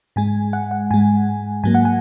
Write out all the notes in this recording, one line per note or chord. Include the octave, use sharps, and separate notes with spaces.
G#2 G#3 G#5
F#5
F#5
G#2 G#3 G#5
G#2 F#3 A#3 G#5
F#5
G#5